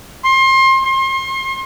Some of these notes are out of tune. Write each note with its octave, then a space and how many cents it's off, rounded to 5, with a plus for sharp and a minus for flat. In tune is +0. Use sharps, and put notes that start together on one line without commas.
C6 +30
C6 +40